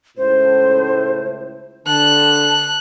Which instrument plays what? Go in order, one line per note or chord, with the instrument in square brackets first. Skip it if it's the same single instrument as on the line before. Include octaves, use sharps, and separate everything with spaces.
[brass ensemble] C#2 A2 [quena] C5
[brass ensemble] D3 [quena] A5 [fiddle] F#6